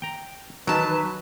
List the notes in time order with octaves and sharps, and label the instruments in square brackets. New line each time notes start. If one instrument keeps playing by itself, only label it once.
[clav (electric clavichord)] G5 A#5
[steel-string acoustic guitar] D#3 A5 [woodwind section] E3 D#4 B4 [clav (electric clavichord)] F#3